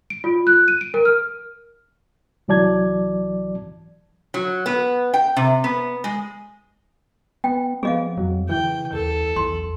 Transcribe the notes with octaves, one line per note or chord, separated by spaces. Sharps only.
D7
F4
F#6
D#7
D7
A#4
F6
C2 E3 F#3 D5 A5 G#6
F#3
B3
G5
C3
B3
G#3
B3 G5
F3 B3 G#4 D#5 F5
F2 F#3
C#3 E3 G5
D#2 A4
B1 E2 C6